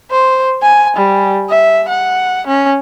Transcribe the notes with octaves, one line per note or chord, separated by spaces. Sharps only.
C5
G#5
G3
E5
F#5
C#4